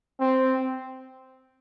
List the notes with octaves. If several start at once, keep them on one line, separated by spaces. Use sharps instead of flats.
C4